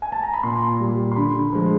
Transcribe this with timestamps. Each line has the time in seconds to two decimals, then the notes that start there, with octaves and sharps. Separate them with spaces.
0.02 G#5
0.12 A5
0.23 A#5
0.34 B5
0.43 A#2 C6
0.80 G3
1.12 C6
1.16 D3 B5
1.53 F3 G#3